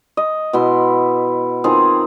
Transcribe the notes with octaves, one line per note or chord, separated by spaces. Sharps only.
D#5
B2 E4 C6
D#3 C4 F4 G#4